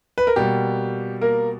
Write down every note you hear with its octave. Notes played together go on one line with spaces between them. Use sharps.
B4
A#4
B2 G3 A#3 G4
A#3 A#4